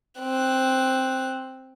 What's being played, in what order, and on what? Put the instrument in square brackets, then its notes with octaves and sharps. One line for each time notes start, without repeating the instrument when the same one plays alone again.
[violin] C4 F#6